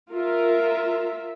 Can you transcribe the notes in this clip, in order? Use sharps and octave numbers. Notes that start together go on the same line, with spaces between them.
F4 A#4 E5